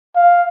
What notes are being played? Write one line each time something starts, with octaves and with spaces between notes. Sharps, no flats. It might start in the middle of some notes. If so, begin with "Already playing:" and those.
F5